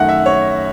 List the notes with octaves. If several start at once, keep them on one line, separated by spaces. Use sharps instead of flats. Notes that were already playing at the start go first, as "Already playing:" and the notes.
Already playing: F#2 D#3 A3 F#5
E5
C#5